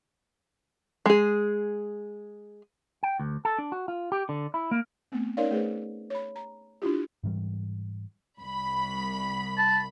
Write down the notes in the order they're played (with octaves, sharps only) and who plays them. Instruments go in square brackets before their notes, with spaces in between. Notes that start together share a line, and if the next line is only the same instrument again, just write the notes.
[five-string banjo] G#3 G#4
[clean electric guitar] G5
D2
A4
D4
F#4
F4
G4
D3
E4
A#3
[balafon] A3 B3 C4
C#4 D#4 A#4 C#5 D5 F5
A3 G#4 B4 C5
C#5 B5
A#5
D4 E4 F4 G4
[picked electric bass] G#2 E3 G3
[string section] C2 B5
[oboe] A5